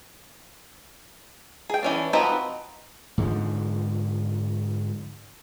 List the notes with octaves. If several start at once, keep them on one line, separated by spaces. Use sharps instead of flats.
G#4 G5
E3 C#4 D4
F3 C4 D#4 F#4 B4
G#2 D3 F3